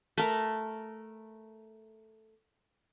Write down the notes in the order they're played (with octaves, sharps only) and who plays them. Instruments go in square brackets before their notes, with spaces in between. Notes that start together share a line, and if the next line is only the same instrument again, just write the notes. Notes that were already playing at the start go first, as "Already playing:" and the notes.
[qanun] A3 A#4